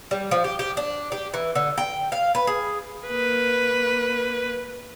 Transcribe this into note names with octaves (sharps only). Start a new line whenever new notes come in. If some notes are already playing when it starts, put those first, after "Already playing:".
G3
F3
G4
G4
D4
G4
E3
D3
G5
F5
B4
G#4
A#3 B4